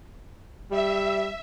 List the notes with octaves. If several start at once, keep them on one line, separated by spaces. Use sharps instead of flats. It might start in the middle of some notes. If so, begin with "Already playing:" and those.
G3 E5